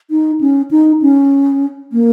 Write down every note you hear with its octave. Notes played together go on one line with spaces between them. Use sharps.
D#4
C#4
D#4
C#4
A#3